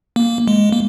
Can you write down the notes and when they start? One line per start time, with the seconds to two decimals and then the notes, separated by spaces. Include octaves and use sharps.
0.16 A#3
0.48 G#3
0.72 A#3